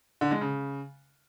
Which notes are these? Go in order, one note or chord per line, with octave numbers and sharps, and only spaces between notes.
D3
G#3
C#3